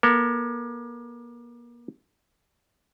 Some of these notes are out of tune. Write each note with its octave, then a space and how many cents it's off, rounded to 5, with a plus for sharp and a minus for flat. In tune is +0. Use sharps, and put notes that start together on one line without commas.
A#3 +40 A4 +45